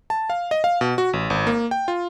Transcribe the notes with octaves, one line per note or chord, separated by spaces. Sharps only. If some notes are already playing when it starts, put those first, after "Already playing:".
A5
F5
D#5
F5
B2
F#4
A1
G#1
A#3
G5
F4